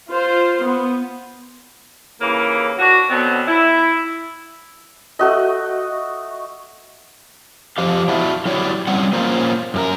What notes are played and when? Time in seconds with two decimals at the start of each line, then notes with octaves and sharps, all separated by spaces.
0.11 F4 C5
0.63 B3
2.20 D#2 C#3 E3 A#3
2.78 D4 F#4
3.09 B2 D3 F#3 B3 C4
3.48 E4
5.19 A3 F#4 D#5
7.78 F3 G4 F5
8.08 D4 E4 F#4 E5
8.45 F#3 E4 F#4 G4 C#5 D5
8.87 G3 C4 C#4 F#5
9.13 A#3 C#4 F4 C5
9.74 F#2 G4 A#4